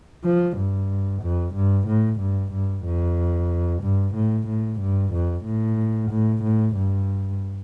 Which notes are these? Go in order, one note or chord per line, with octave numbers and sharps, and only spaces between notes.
F3
G2
F2
G2
A2
G2
G2
F2
G2
A2
A2
G2
F2
A2
A2
A2
G2